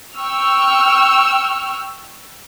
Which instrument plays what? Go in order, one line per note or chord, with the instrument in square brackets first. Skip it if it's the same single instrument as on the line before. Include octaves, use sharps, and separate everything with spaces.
[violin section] G5 C#6 E6 F6